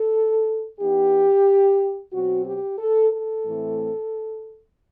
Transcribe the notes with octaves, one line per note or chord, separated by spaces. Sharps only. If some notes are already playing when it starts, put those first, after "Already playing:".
Already playing: A4
E3 B3 D#4 G4
B2 F#3 C4 F#4
G4
A4
A4
A2 E3 A3 C4